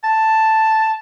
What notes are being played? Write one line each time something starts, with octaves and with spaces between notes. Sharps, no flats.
A5